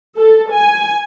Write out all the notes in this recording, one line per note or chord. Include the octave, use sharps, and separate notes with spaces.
A4
G#5